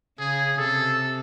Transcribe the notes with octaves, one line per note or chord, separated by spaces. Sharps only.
C#3 G#4
C3 A4